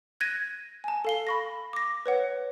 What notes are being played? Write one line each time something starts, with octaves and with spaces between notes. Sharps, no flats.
F#6 G#6 A#6 D#7
G#5 A5
A4 F5 G7
B5 C#6 A#6
D6 A#6
B4 C#5 F#5